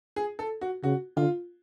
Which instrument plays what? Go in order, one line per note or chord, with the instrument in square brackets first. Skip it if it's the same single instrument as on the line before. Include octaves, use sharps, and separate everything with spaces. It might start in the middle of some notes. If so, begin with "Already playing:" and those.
[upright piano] G#4
A4
F#4
[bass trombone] C#3 [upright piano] F#4
[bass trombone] D3 [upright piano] F4